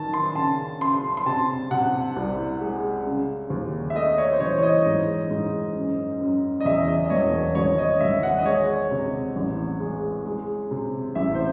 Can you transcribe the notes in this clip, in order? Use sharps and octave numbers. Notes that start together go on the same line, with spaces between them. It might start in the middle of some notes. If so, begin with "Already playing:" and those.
Already playing: D#3 F#3 A5
C6
C#3 A5
C#3 C6
C6
C3 A5
C3 F#5
C2
G#3
C#3
D#2
E5
A3 D#5
C#5
C5
E3 C#5
C#5
D#5
G#2
G#2
F#2
F#2
D#5
E2 E5
D#5
D#5
E1 C#5
G#1 C#5
D#5
G#1 E5
F#5
D#5
G#3 C#5
C3
A1
G#3
G#3
C3
A1 E5
C5